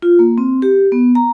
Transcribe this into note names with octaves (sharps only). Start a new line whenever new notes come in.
F4
A#3
C4
G4
B3
A#5